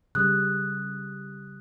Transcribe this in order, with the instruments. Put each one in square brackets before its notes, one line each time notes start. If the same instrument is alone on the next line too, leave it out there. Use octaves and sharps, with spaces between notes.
[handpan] C#3 G3 [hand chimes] D#6 F#6